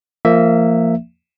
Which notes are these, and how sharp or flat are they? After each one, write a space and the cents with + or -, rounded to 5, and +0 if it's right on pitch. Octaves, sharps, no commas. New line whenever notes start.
F3 -20 A#3 -20 E5 +0